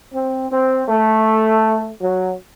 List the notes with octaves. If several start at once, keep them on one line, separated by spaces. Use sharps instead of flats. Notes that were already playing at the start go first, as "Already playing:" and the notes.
C4
C4
A3
F#3